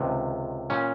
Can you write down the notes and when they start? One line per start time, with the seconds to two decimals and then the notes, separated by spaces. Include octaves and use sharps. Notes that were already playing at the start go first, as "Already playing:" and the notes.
Already playing: C#2 C3 D#3
0.70 A#2 C#4